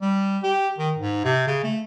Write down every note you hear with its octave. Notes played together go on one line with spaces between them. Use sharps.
G3
G4
D#3
G#2
C3
C#3
A3